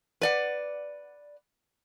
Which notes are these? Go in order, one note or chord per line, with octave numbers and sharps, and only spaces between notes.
B4 D5 F#5